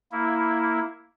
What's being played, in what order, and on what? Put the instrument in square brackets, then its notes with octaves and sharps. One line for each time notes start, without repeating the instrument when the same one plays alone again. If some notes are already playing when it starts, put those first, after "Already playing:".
[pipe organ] A#3 E4